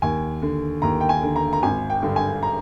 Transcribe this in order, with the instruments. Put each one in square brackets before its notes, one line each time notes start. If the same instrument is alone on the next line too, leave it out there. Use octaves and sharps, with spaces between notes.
[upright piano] D#2 G#5
D3
D#2 A#5
G5
G#5
D3
A#5
A#5
G#1 G#5
G5
G2 D3
G#5
A#5